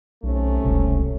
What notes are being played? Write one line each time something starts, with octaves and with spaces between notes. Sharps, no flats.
B1 C3 A3 C#4
E1 C2